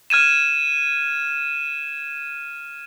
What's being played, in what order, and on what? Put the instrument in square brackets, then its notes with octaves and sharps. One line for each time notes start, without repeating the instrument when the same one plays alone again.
[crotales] F6 G#6 D#7 E7